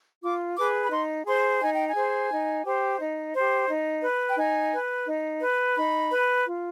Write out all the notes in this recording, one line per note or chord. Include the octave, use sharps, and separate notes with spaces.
F4 D6
G#4 B4 D6
B5
D#4 C6
G#4 C5 C6
D#4 G#5
G5
G#5
G#4 C5
D#4
G4 C5
D#4
G4 C5
D#4
B4
G5
D#4 G#5
B4
D#4
B4
D#4 B5
B4
F4